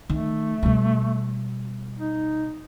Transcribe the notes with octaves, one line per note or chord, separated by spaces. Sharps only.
D#3 A3
B2 G3
D#4